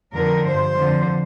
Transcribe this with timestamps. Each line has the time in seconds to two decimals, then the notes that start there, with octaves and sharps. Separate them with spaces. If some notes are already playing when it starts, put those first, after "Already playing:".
0.13 F2 D3 F3 A#4
0.46 G2 F3 C5
0.78 F2 D3 F3